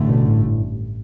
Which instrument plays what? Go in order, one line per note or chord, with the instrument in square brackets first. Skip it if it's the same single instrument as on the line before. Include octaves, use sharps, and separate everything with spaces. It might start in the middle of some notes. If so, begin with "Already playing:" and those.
Already playing: [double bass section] A1 G2 D3 A3
[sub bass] B2
A2
A2